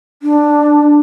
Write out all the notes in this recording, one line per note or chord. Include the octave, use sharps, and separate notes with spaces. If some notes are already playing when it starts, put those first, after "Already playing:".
D4